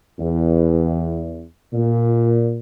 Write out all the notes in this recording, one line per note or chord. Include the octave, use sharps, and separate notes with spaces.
E2
A#2